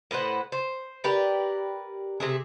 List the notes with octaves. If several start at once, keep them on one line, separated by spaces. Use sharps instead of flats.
A2 B4 C5 F#5
C5
G4 A#4 B4 D5
C3 A3 G#4